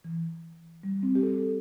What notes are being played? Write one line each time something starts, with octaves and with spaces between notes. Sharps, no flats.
E3
G3
C4
G4
A4